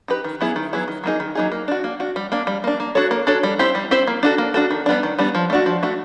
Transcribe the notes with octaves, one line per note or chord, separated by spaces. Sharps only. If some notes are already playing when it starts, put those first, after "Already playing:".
D#4 G4 B4
D#3
F#3 B3 E4 G#4
D#3
F#3 B3 E4 G#4
D#3
F#3 A#3 D#4 G#4
D#3
F#3 A#3 D#4 G#4
A#3
D4 F#4
A#3
D4 F#4
G3
A#3 D4
G3
A#3 D4
A#3
D4 F#4 A4 C#5
A#3
D4 F#4 A4 C#5
G3
C4 E4 G4 C5
G3
C4 E4 G4 C5
A#3
D4 F#4 A4
A#3
D4 F#4 A4
D#3
G3 B3 D4
D#3
G3 B3 D4
F3
A3 D4 F#4
F3
A3 D4 F#4